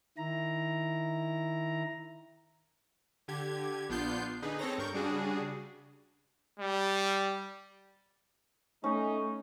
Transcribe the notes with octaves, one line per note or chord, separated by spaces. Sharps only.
D#3 E4 A#5
D3 G4 G#6
A#1 B3 D4 F4 G6 C7
D3 D#4 G#4 B4
C4 A4 C#5 A#6
G2 A#4 C#6 G6
C#3 G3 D4 F#4 G#4
G3
A3 C#4 D#4